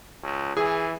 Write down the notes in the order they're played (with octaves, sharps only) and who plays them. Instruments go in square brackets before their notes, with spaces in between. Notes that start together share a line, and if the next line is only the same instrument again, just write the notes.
[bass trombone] C#2
[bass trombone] E3 [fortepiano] G#4